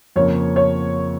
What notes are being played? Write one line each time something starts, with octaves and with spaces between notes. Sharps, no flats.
F2 C#3 F3 A#3 C#5
C#5